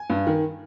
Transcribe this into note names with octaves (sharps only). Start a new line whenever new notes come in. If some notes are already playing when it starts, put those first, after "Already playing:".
Already playing: G#5
G2
D#3